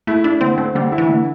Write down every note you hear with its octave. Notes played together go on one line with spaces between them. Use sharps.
A3 E4
D4 E4
D3 C4
A3 C4
D3 G3
E4
E3
D3